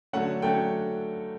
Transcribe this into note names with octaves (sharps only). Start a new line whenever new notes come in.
D3 F#3 A3 C#4 F#5
D3 F#3 A3 C#4 G5